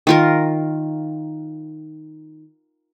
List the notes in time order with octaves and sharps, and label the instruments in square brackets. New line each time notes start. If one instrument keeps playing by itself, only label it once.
[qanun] D#3 F4 A#4